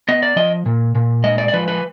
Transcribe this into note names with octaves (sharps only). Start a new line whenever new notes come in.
B3 D#5
D5
F3 D#5
A#2
A#2
G#3 D#5
D5
D5
F3 B4
B4